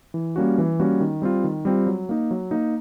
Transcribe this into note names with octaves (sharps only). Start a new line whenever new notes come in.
E3
G3 A#3 C#4 F#4
E3
G3 A#3 C#4 F#4
D#3
G3 C4 F4
D#3
G3 C4 F4
F#3
A#3 D#4
F#3
A#3 D#4